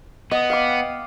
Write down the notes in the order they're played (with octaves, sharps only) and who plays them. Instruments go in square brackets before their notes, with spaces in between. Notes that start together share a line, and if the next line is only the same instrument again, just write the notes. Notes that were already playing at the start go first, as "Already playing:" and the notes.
[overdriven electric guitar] B3 [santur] D#5
[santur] F5 G5 D6